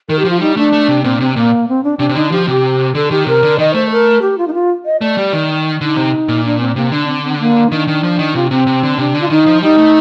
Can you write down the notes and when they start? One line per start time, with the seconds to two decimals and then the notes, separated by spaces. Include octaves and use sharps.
0.09 D#3 A#4
0.19 G4
0.25 F3
0.30 F4
0.41 G3 D#4
0.57 A3 D4
0.72 A3
0.88 C3
1.04 A#2 C4
1.20 C3 C4
1.36 A#2 A#3
1.68 C4
1.84 D4
1.99 C3 D4
2.09 C3
2.15 D3 D#4
2.32 F3 G4
2.47 C3 G4
2.95 D3 A4
3.11 D#3 G4
3.26 C3 A#4
3.43 D3
3.59 D#3 D#5
3.74 A3 C5
3.91 A#4
4.22 G4
4.38 F4
4.48 D#4
4.54 F4
4.85 D#5
5.01 A3 D5
5.17 G3
5.33 D#3
5.80 D3 D#4
5.96 C3
6.28 A#2
6.45 D4
6.61 C4
6.76 C3 A#3
6.92 D3 D4
7.08 C4
7.24 C4
7.39 A#3
7.72 D#3 D4
7.87 D#3
8.03 F3
8.19 D#3
8.35 C3 F4
8.51 C3 C4
8.67 C3
8.83 D3
8.98 C3 D4
9.14 D3
9.21 F4
9.30 D#3 D#4
9.46 F3
9.62 G3 D#4
9.77 A3